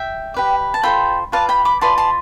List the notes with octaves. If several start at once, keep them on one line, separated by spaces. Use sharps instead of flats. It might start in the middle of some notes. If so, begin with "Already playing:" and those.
Already playing: E5 G5
G4 B4 D5
A5
F4 A4 C5 G5 B5
F4 B4 D5 F5 A5
G5 B5
B5 D6
F4 B4 D5 A5 C6
A5 C6